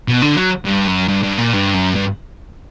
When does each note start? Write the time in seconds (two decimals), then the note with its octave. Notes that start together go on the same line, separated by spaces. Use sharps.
0.08 B2
0.22 D3
0.36 F#3
0.65 G2
0.88 F#2
1.09 G2
1.23 G2
1.38 A#2
1.53 G2
1.74 F#2
1.96 G2